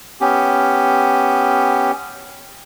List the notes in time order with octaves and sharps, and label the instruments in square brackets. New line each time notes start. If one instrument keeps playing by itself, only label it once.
[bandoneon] B3 C#4 G4